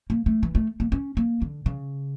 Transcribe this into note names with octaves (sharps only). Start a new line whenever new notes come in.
A#3
A3
E3
A3
A#3
C#4
A#3
D3
C#3